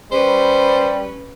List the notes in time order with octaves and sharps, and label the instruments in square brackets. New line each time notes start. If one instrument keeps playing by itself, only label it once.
[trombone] G3 [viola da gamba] C#4 B4 [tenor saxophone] C5